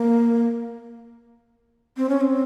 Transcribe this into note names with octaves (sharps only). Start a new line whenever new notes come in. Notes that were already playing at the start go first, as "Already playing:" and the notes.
Already playing: A#3
C4
C#4
C4